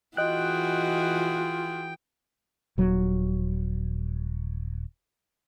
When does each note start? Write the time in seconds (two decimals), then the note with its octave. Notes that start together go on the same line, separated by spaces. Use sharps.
0.17 E3 F4 F#4 G#4 D#5 G5 F#6
2.78 D#1 F#3